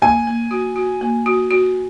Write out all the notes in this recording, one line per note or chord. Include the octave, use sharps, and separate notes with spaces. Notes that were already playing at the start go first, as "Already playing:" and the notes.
A#3 G#5
A#3
F#4
F#4
A#3
F#4
F#4